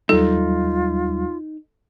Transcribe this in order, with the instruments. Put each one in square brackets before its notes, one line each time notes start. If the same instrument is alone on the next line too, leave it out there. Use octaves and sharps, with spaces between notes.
[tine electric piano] D#2 F#3 G3 [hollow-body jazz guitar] D#4 [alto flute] F4 [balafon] A4